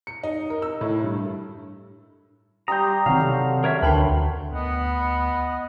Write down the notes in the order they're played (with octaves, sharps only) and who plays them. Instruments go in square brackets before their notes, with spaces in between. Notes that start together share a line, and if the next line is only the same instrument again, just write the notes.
[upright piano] C#7
D#4
A#4
E6
A2
G2
[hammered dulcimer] G3 G4 C6 [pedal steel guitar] A#5 [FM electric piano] D#6 G6
[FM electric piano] C3 D#3 C4 [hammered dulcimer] F#3 F#4 [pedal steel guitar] F5
[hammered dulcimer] A4
[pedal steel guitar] A#4 C#5 E5
[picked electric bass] D2 D4 [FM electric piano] A#4 G5 A5 [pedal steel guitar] B4 B5 C6
[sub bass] D2 [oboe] B3 [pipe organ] D#5 F#5